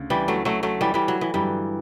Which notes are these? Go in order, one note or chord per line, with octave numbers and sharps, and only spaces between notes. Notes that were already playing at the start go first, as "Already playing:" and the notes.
Already playing: D2 C#3
E3 G3
F#3 A3
F#3 A3
F#3 A3
E3 G3
E3 G3
F#3
E3
G2 D3 E3 F#3 G3